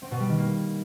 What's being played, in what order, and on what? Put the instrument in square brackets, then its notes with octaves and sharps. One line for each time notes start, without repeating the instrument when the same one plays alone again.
[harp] C4
B2
G3
D#3
A#3